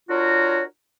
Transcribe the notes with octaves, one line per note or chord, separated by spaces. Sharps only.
D4 F4 F#4 A#4 C#5